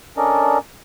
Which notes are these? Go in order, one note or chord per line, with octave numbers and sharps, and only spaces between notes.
C#4 D4 A4 A#4 D5 D#5